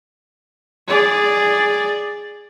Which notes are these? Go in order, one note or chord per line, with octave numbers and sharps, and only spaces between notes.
G#4 D5